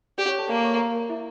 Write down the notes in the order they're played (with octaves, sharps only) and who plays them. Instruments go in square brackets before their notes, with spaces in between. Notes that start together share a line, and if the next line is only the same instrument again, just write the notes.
[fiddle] G4 [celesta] D5 D6
[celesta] C#5 C#6
A4 A5
[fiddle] A#3 [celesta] D5 D6
[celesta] C#5 C#6
A#4 A#5
E4 E5